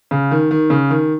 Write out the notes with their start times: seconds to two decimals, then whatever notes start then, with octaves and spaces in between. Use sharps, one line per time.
0.11 C#3
0.31 D#3
0.51 D#3
0.70 C#3
0.90 D#3